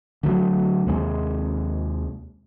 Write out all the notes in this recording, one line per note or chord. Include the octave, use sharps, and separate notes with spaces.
D3 F#3 A3
D#2 C3 G#3 A#3